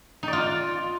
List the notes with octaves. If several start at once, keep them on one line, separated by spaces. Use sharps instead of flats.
D#4
D5
F4